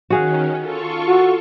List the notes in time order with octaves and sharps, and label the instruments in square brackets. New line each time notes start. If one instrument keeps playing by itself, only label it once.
[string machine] D#3 C#4 [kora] F#4 G#4 F5
[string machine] F4 A4 C#6
[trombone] F#4